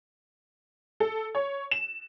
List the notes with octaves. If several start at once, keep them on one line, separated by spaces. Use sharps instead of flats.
A4
C#5
E7